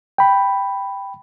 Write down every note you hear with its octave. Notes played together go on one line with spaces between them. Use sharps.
G5 B5